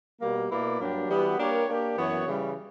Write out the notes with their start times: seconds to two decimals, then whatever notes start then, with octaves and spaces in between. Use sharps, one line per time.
0.21 B2 G3 A#3
0.50 B2 A#3 E4 B4 D5
0.80 G2 F#3 A#3 D4 G4
1.09 E3 G3 B3 F#4 B4
1.39 A#3 D4 G4 A#4 C#5
1.68 A#3 D4 G4
1.97 F#2 E3 B3 F#4 C#5
2.26 C#3 E3 G3